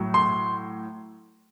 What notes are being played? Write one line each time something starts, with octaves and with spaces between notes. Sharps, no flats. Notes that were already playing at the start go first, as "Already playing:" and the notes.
Already playing: A2 F#3
C6